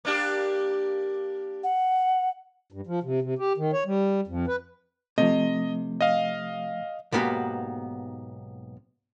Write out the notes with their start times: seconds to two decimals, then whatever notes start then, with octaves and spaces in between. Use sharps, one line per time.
0.05 A#3 D4 G4
1.64 F#5
2.72 G2
2.87 F3
3.03 C3
3.22 C3
3.39 G4
3.57 D#3
3.73 C#5
3.86 G3
4.27 F2
4.47 B4
5.18 C3 F3 A3 D#5
6.01 D#5 F5
7.12 B1 G#2 A#3 B3 F#4 G4